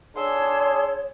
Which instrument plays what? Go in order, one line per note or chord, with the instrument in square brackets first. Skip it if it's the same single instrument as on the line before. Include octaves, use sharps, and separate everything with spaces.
[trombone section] D4 G#4 [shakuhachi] C#5 [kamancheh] C6 E6